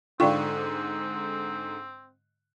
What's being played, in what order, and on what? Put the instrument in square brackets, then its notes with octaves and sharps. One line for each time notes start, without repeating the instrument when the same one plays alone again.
[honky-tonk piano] G#2 D3 [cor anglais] C4 [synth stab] F4 [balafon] D5 G5 C#6